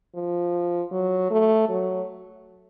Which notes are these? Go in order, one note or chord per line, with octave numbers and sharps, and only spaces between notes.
F3
F#3
A3
F#3